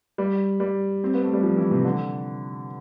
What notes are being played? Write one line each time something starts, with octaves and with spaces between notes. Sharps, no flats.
G3
G3
C4
B3
A3
G3
F3
E3
C3
D3